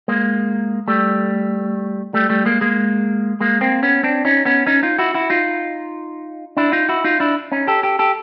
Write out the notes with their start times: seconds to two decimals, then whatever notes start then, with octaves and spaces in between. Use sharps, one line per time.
0.08 G#3 A#3
0.88 G3 A3
2.14 G3 A3
2.29 G3 A3
2.46 G#3 A#3
2.61 G#3 A#3
3.40 G#3 A#3
3.61 A#3 C4
3.83 B3 C#4
4.04 C4 D4
4.25 C#4 D#4
4.45 B3 C#4
4.67 C#4 D#4
4.83 D#4 F4
4.99 E4 F#4
5.14 E4 F#4
5.30 D#4 F4
6.57 D4 E4
6.72 D#4 F4
6.89 E4 F#4
7.04 D#4 F4
7.20 D4 E4
7.52 C#4 D#4
7.67 G4 A4
7.83 G4 A4
7.99 G4 A4